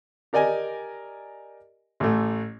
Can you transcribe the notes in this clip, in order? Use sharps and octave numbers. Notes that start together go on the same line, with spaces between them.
G4 A#4 D5 D#5 G#5
A1 A3